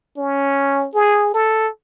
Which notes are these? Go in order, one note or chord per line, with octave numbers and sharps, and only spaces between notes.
C#4
G#4
A4